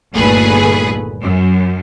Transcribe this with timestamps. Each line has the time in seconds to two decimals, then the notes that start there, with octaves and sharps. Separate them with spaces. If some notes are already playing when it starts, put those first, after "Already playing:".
0.15 G1 D#2 A#2 A3 G#4 B4
1.21 F#2